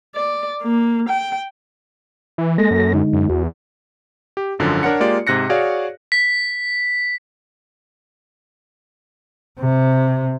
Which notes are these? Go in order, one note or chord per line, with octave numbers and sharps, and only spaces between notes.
D5
A#3
G5
E3
G#3 A#3 A4 A#6
F#2
D3 G#3 D#4
F#2
E2 F#4
G4
G#1 F#2 D3 F3
D4 A#4 C#5 F#5 C#7
G#3 A#3 F4 G4 D5
G#2 C3 F#6 A#6 C#7
F#4 G#4 C#5 D5 F5
B6
C3